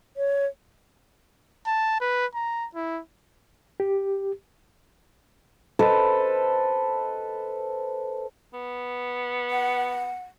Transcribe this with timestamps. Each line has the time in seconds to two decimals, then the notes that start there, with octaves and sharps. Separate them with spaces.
0.17 C#5
1.67 A5
2.01 B4
2.35 A#5
2.75 E4
3.80 G4
5.79 A4 B4 C5 D#5
8.53 B3
9.51 F#5